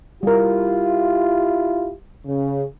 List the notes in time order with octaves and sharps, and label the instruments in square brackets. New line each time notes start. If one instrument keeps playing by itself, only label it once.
[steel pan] G3 A#4 [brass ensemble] E4 F4 G4
[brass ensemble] C#3